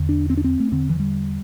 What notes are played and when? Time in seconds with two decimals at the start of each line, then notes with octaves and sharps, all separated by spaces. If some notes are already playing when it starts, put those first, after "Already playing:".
Already playing: E2 D3
0.09 D4
0.30 C4
0.37 D4
0.44 C4
0.60 A3
0.71 E2 D3 C4
0.89 E3
1.00 G3